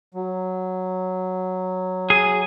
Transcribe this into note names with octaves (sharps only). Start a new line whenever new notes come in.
F#3
G#4